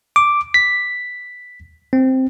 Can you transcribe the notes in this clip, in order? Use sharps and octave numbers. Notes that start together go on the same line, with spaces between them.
D6
B6
C4